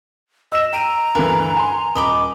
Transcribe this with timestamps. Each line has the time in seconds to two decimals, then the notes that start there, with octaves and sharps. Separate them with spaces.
0.52 D#5 E6 E7
0.73 G5 A#5 D7 D#7
1.15 D2 G2 E3 A#4 B4 F5
1.57 G#5 C6
1.95 D#1 D#5 B5 D6 G7